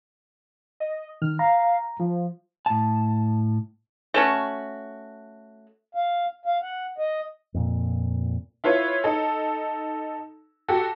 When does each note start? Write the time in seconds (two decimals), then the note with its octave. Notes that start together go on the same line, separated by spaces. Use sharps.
0.80 D#5
1.22 D#3 F6
1.39 F5 A#5
1.99 F3
2.66 A2 A5
4.14 A3 C#4 F#4
5.95 F5
6.46 F5
6.62 F#5
6.98 D#5
7.54 F2 A#2
8.64 E4 F4 B4 C#5
9.04 D#4 A4
10.68 F#4 G4 A4